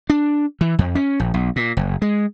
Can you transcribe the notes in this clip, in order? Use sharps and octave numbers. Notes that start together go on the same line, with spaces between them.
D4
E3
F2
C#4
A#1
B1
A#2
F#1
G#3